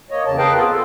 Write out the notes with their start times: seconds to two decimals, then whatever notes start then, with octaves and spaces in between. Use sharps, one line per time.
0.11 A#3 C#5 D#5
0.26 E2 C#3 A5
0.38 A#4 B4 D#5 F5 G5 A5
0.55 B3 C4 F4 G#4
0.70 F4 A4